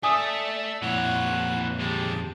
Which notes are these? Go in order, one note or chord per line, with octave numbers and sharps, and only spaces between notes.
A3 D5 E5 G#5 D#6
F2 A#2 E3 C#5 F#5 F#6
D#2 G#3 G4 A5